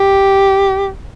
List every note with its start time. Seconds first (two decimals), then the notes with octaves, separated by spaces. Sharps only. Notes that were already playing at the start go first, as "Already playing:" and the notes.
Already playing: G4